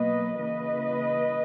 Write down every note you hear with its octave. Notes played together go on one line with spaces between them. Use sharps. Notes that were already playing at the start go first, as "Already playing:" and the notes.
Already playing: B2 F#3 A#3 B4 D#5
C#3 E3 A#3 B4 D#5